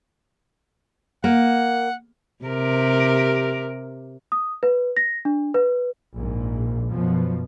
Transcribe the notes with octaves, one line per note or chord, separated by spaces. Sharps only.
A#3 F#5
C3 G4 A#4
D#6
B4
A#6
D4
B4
A#1 G#2
F#2 B2 F3